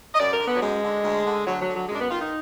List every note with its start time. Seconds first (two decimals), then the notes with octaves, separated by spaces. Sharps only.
0.14 D#5
0.19 F#2 D5
0.33 A#4
0.40 D3
0.47 B3
0.56 F#3
0.61 F#2 G#3
0.83 D3
1.04 D2
1.26 D3
1.47 D2 F#3
1.61 F#3
1.68 D3
1.75 F#3
1.89 F#2 G#3
1.95 D4
2.00 B3
2.10 D#3 F4
2.20 D#4